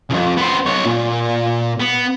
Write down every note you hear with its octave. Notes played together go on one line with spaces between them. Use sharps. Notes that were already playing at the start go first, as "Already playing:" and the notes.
C2 F2
B3 C5
B1 C#5
A#2
B3